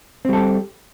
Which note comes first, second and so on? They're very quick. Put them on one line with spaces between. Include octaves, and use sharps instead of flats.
C4 G3 A4 G4